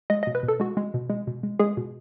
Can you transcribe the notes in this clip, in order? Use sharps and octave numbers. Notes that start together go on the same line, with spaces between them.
G#3 D#5
D#5
B2
B4
B2
A4
G#3 F#4
G#3
B2
G#3
B2
G#3
G#3 G#4
B2